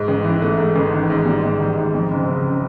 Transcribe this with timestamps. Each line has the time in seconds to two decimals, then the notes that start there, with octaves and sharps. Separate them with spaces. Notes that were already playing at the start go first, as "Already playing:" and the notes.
Already playing: G#2
0.08 A1
0.24 E3
0.42 A3
0.58 G#2
0.76 A1
0.92 D#3
1.10 G#2
1.26 G3
1.43 G#2
1.59 D#3
1.78 G#2
1.94 F2
2.11 F#1
2.28 C#3